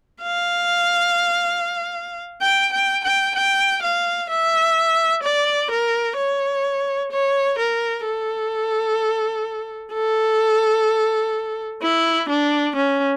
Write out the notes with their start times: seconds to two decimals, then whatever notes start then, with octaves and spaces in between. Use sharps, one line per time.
0.22 F5
2.42 G5
2.73 G5
3.04 G5
3.35 G5
3.83 F5
4.30 E5
5.23 D5
5.71 A#4
6.17 C#5
7.12 C#5
7.59 A#4
8.05 A4
9.93 A4
11.82 E4
12.29 D4
12.75 C#4